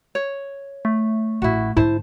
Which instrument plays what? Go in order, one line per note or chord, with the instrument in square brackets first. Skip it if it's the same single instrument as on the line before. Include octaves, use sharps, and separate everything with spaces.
[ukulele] C#5
[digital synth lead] A3
[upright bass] A1 [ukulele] E4 F#4
[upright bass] G#2 D3 [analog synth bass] E4 [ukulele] C5 A5